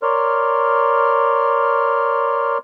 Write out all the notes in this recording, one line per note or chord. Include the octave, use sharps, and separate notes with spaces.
A#4 C#5 D5 C6 F6